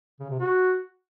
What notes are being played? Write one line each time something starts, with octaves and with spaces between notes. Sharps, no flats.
C#3
C3
F#4